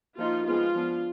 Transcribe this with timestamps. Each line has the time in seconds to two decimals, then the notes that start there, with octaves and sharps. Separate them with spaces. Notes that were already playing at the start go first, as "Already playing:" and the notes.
0.18 F3 A#3 D#4 F4
0.46 F3 G#3 B3 F4
0.75 F3 B3 D4